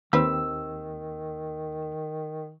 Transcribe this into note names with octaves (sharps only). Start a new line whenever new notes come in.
D#2 D#3 C4 B4 E6